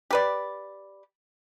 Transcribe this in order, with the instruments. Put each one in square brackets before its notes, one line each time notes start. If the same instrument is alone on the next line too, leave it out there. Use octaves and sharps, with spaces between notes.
[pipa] G4 B4 D5